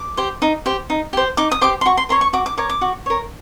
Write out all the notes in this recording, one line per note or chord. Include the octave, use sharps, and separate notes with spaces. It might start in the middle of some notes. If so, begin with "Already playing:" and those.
Already playing: D6
G4 C5
D#4
G4 C5
D#4
G4 C5
D#4 D6
D#6
G4 C5 D6
C6
F#4 C#6
C6
A#4 C#5 C6
C#6
F#4 D6
D6
A#4 C#5 D6
D6
F#4
A#4 C#5